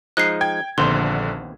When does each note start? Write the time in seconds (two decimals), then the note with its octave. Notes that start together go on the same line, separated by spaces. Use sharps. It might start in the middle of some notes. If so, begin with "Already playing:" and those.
0.17 F3 G#3 D#4 F#6 C7
0.41 G5 G#6
0.78 A#1 D#2 D3 B3 C4 C6